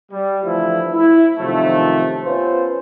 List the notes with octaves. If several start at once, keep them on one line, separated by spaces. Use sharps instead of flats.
G3
D3 E3 F3 A3 E4
E4
F#2 C3 D#3 F3 F#3 A3
B3 C#4 F4 B4 C5